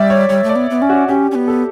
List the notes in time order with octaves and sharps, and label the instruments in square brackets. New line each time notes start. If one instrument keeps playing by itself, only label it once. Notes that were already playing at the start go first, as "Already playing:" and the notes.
Already playing: [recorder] G3 [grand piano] D5 E5
[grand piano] C#5
[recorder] G3 [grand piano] C#5
[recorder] A3
[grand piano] D5
[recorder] B3
B3
C#4
[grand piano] F#4
[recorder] C#4 [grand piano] G4
[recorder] C#4
B3
[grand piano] A4